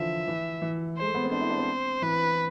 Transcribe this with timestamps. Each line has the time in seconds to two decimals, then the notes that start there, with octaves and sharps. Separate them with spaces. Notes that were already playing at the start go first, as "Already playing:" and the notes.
Already playing: D3 E3 F3 E5
0.28 E3
0.62 E3
0.98 G#3 C5
1.06 A3
1.15 B3
1.24 C4
1.31 D4 C5
1.40 E4
1.49 D4
1.58 C4
2.02 E3 B4